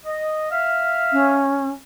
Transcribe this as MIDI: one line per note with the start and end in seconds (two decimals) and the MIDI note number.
0.05 0.49 75
0.51 1.44 76
0.51 1.44 77
0.51 1.44 89
1.13 1.70 61